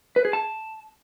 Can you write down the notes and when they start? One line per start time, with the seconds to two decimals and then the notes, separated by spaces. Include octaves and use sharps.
0.16 B4
0.25 G#4
0.33 A5